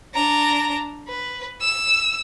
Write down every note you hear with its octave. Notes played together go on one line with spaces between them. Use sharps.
D4 A#5
B4
E6